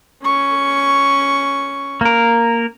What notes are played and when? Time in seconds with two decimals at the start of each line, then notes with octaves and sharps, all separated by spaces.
0.23 C#4 C#6
2.01 A#3 A#4